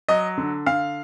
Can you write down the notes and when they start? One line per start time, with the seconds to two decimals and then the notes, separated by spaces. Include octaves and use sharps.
0.09 F#3 D#5
0.38 D3
0.66 D3 F5